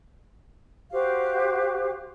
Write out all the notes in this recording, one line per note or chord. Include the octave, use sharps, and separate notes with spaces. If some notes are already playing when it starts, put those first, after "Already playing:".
F#4 G4 C5 F5